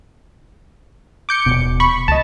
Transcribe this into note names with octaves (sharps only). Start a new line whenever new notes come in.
D6 G6 C#7
D#1 G#1 B2
B5 C#6
C#2 D#5 A5